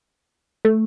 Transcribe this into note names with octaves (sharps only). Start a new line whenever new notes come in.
A3